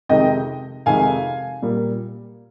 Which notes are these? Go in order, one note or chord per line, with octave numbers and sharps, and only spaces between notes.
F2 C3 D#3 G#3 D#5 G5
F2 C3 D#3 G#3 F5 G#5
A#2 G3 A#3